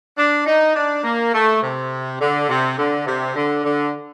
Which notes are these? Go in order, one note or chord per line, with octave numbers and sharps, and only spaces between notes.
D4
D#4
D4
A#3
A3
C3
D3
C3
D3
C3
D3
D3